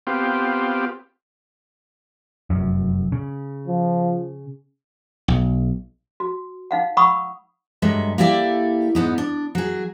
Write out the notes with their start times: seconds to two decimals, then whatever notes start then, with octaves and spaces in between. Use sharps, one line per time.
0.07 B3 C4 F4 G4
2.50 F1 F#2
3.12 C#3
3.68 F3
5.28 B1
6.20 F#4
6.71 D#4 F5 F#5
6.97 F#5 B5 C#6 D#6 E6
7.82 G2 F#3 G#3 A4 E5
8.18 A#3 E4 G4 A4 D5 E5
8.95 G#2 B3 D#4
9.18 D4
9.55 F#3 G#4